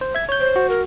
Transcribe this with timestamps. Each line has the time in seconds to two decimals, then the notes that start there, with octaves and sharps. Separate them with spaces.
0.01 C5
0.15 E5 G#6
0.29 C#5 G6
0.40 C5
0.56 F#4
0.69 A#4